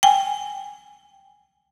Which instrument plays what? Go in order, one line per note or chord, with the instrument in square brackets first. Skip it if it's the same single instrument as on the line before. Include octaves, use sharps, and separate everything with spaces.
[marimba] G5 G#5